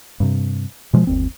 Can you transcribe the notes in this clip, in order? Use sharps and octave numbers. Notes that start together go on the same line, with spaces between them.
G2 C3
B2 F3 G#3
G1 D#2 C4